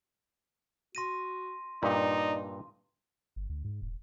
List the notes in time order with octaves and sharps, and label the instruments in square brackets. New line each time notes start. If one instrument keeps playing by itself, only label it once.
[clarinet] F#4 [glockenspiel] C6 A#6 D#7
[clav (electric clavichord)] G2 A#2 E5 [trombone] D#4 [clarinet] D5
[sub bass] G1
D2
G#2
D#1